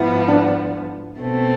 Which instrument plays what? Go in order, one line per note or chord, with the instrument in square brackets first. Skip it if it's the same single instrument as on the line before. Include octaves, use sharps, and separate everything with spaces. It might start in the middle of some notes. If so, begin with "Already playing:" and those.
Already playing: [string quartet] G#2 F3 B3 [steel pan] E4
[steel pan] D4
[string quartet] B2 A3 C4